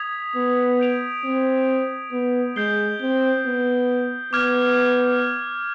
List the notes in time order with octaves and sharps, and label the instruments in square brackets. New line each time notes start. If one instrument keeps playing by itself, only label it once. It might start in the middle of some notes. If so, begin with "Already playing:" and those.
Already playing: [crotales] D#6 G#6 B6 F7
[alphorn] B3
[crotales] G6 D7 F7
[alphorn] C4
B3
[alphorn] G#3 [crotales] G6 C7 G7
[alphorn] C4
B3
[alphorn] B3 [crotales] D6 F6 G#6